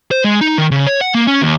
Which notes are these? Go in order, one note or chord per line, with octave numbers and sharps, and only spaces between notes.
C5
G#3
D#4
D#3
C#3
C#5
F#5
A#3
C#4
D#2